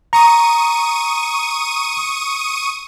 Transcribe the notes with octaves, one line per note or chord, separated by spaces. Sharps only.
A#5 C#6 D#6 D#7